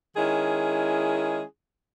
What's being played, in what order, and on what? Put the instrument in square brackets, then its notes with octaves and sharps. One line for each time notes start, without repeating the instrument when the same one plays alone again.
[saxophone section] D#3 G#3 C#4 E4 G#4